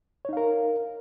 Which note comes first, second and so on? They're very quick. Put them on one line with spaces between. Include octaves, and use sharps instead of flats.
C#5 D#4 F5 A#4